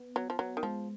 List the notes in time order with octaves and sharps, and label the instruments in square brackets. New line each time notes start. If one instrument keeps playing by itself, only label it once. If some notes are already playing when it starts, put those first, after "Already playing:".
Already playing: [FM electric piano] B3
[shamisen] F#3 [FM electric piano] B3
[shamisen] F3
[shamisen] F#3 [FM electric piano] B3
[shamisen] D#3
[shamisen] F3 [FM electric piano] G#3